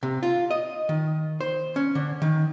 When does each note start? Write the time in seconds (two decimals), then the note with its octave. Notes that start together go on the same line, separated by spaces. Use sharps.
0.03 C3
0.23 F4
0.51 D#5
0.89 D#3
1.41 C5
1.76 C#4
1.95 D3
2.22 D#3